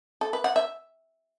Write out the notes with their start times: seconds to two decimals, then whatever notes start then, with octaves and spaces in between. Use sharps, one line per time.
0.21 A4
0.33 B4
0.44 F#5
0.56 E5